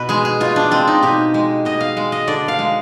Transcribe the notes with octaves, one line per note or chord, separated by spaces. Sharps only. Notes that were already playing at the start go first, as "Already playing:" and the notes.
Already playing: B2 B4
G#3 G#4
G#4
B2 F4
D4
G#3 C4
D#4
B2 G4
G#3
B2 D#5
F5
G#3 F5
D#5
D3 D5
F5
G#3